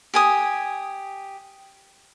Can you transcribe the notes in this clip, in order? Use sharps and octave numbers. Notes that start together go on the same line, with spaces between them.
G4 G#5 D#6